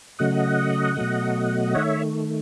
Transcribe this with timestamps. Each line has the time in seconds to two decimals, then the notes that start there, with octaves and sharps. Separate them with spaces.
0.19 C#3 F#3 A3 D#5 F#5
0.97 B2 F#3 A3
1.75 D#3 A3 C#5 E5